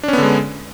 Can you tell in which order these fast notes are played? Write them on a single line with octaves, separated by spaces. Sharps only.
D4 C#4 B3 D3 G#3